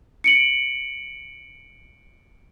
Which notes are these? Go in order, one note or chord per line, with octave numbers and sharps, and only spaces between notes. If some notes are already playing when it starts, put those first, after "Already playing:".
C#7 D7 F#7